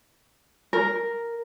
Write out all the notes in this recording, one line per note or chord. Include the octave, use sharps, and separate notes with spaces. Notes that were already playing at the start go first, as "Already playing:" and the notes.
A#4